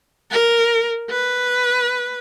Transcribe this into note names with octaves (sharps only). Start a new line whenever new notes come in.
A#4
B4